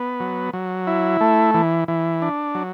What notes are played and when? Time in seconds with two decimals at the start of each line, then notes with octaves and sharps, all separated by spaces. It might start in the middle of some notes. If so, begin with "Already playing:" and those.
Already playing: B3
0.20 F#3
0.53 F#3
0.87 E4
1.21 A3
1.54 E3
1.88 E3
2.22 D4
2.55 F#3